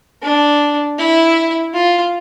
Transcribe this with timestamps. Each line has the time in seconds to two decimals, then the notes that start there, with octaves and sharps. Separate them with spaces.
0.22 D4
0.99 E4
1.74 F4